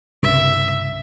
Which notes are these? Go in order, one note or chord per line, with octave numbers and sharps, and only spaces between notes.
C2 G2 C#3 E5